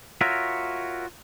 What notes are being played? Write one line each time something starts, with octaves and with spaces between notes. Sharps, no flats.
F4 F#4 A#4 C#5 E5